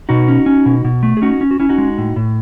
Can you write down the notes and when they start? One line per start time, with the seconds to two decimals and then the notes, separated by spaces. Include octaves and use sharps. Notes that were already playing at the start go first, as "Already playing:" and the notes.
0.09 B2 D#4 F#4
0.28 C#4
0.46 C#4
0.66 B2
0.85 B2
1.03 A3
1.17 G#4
1.22 C#4 D#4 F#4
1.41 C#4
1.51 F#4
1.60 C#4 E4
1.69 D#4 F#4
1.78 G#3
1.98 A2
2.16 A2